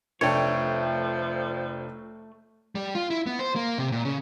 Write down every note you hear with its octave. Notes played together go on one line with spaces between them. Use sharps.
F1 F3 A3 D4 C#5 G5
G3
F4
E4
B3
C5
A#3
C3
A#2
C#3